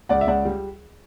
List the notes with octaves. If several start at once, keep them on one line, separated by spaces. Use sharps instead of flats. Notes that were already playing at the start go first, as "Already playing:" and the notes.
C#2 D5 F#5
E5
C#2 D5 F#5
G3